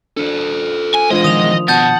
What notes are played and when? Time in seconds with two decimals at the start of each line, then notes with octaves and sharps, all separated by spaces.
0.17 D4 A4 C5
0.94 G#5
1.10 E3 G#3 D4 F4 C5 D#5
1.24 D#3 F3 D#6 F7
1.68 B2 F#5 A5 G6 A6